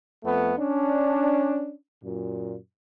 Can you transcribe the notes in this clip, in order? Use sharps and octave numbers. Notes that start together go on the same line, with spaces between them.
F2 A3 B3
C#4 D4
F#2 A#2